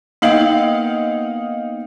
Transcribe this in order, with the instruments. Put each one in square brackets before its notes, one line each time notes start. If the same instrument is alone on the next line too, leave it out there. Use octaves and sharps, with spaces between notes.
[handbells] A#3 B3 G5 [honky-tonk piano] D#4 F5 F#7